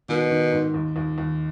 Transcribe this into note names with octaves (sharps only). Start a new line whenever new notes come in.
B2 D#3
D#3
G#2
D#2
D#2
D#2